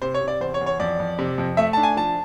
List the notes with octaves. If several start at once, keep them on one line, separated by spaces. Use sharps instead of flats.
C3 C5
C#5
C3
D5
E2 C5
C#5
E2
C#5
F2 D5
F2
C3
F2
A3 E5
D4 A5
G#5
F3 A5